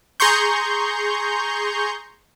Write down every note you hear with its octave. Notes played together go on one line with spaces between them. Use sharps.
G#4 A#5 C6 C#6 G6